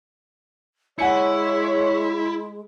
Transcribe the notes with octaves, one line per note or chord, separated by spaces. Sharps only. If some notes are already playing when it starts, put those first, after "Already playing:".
G#3 E4 C#5 F#5 G#5 C#7